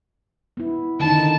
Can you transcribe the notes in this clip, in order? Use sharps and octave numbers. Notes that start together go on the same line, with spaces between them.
B3 E4
D3 D#3 D#4 A5